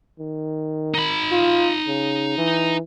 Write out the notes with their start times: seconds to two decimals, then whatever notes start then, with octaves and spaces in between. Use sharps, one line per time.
0.19 D#3
0.94 D#4 B5
1.32 F4
1.87 C#3
2.38 E3